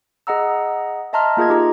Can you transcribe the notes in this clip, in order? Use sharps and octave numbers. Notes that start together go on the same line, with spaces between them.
G#4 D#5 F#5 A#5 E6
D#5 E5 A5 A#5 C6 F6
A#3 F4 G#4 D#5 G#6
D#4 G4 G#4 A#5